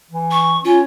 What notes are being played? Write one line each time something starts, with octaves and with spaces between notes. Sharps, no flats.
E3
C#6
C#4 F4